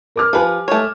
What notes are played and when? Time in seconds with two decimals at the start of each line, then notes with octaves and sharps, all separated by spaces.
0.16 A#4 D6 F6
0.33 F3 G4 B4 G#5
0.68 A3 C#5